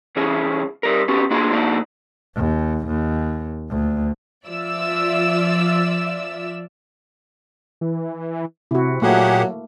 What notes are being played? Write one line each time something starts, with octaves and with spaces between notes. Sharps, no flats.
C2 E3 C#4 G#4
G3 A#4
B3 C#4 F#4 G4
A#3 D4 F4 F#4 G#4
A#2 A#3 D4 D#4 F#4
D#2
D#2
D2
F3 F4 D5 E5 E6
E3
C3 E4 F#4
A#2 F#3 A3 A#3 G4 G#4 F#5